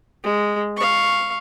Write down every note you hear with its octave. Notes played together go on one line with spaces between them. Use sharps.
G#3
F5 C#6